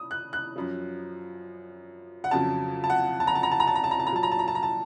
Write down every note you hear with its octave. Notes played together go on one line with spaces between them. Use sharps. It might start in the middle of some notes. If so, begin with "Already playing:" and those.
Already playing: D#6
F#6
F#6
F#2 F3
F#5
F2 C#3 F#3 A5
A5
F#5
A5
A#5
A5
A#5
A5
A#5
A5
A#5
A5
A#5
A5
A#2 A#5
F#3 A5
A#5
A5
A#5
A5
A#5
A5